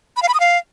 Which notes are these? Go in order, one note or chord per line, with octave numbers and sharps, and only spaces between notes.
B5
F5
B5
D#6
F5